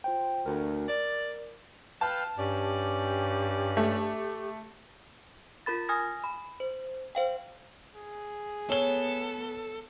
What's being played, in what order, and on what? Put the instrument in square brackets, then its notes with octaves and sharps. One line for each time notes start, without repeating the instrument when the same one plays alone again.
[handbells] F4 C5 G5
[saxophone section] D2 [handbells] A#4
[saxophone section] D5
[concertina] B4 F5 G5 [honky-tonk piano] A5
[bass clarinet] G2 [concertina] C#4 D5 [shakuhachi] G4
[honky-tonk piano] A3
[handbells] F4 A#4 B5 A6
G#5 D#6 F6 G#6 A#6
B5
C5
C5 F5 G5
[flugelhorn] G#4
[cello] B3 [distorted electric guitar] A4 [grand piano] C#5 G7